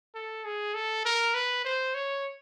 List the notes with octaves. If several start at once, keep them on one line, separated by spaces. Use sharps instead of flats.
A4
G#4
A4
A#4
B4
C5
C#5